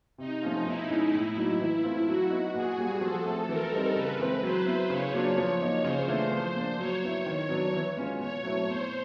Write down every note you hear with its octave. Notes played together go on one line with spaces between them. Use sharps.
C3 D#4
F3 A3 C#4 F4
B2 E4
G#3 C#4
A2
F#3 A#3 D#4
E3
A3 C4 F4
F#3 F#4
B3 D#4
A#2 G#4
G3 A#3
F3 A4
A3 C4
E3 A#4
G3 C4 D#4
C#3 B4
E3 G#3 C4
F#3 C5
B3 E4
C#3 C#5
F#3 A#3 D4 F4
F3
A#3 D#4
C#3 C5
E3 A3 D4 F4
F3 C5
A#3 D4
F#3 C#5
B3 E4
D#3
F#3 B3 D4
E3
G#3 C#4 F4
B2 C#5
F#3 A3 C4 E4
B2 C5